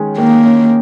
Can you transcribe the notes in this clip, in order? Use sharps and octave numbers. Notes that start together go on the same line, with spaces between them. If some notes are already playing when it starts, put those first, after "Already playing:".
Already playing: D#3 G#3 C#4
D#3 A#3
C#4